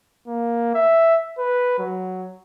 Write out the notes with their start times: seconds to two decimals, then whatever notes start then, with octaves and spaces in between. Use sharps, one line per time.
0.27 A#3
0.74 E5
1.38 B4
1.79 F#3